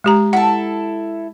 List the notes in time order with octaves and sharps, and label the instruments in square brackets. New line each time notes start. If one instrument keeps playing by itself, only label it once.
[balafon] G#3 G4 A#5
[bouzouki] E4 A4 [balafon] F#5